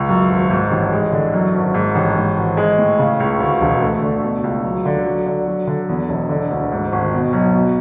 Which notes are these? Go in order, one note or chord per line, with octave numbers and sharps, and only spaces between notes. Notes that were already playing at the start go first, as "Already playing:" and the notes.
Already playing: C#2
F#2
G#1
G#2
A1
G#3
D3
F#2
G#1
G#2
A1
G#2
G#1
G#3
A2
C#3
C#2
D2
E1
A3
D3
B2
C#2
F#3
D3
F#3
D3
F#3
D3
E2
E1
D3
D2
G#2
G#1
B2
B1
B2